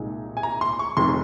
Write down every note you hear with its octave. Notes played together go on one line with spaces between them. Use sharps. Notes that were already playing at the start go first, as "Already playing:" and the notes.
Already playing: C2 A#2 G#3 D#4
G#5
A#5
C6
C#6
F1 F2 D#3 C6